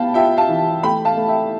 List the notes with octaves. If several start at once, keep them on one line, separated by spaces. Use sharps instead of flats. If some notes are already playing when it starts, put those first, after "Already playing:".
Already playing: B3 F5 G5 A5 B5
F4 E5 G5
F5 A5
E3
A3 G5 B5
F5 A5
A3
E5 G5